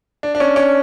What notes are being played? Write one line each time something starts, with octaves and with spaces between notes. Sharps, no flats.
D4
D4
C#4
C#4